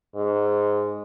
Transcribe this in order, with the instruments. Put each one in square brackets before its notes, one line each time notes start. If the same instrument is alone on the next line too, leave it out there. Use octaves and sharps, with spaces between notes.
[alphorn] G#2